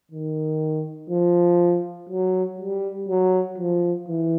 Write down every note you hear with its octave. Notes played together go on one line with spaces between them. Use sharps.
D#3
F3
F#3
G3
F#3
F3
E3